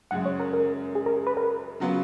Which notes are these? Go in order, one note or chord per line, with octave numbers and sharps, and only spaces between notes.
F#2 C#3 G#3 F#5
C#5
A#4
A#4
G#4
A#4
G#4
B4
A#4
C#3 F#3 B3 F4